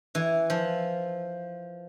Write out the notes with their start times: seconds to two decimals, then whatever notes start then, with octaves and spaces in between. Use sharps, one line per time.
0.15 E3
0.50 F3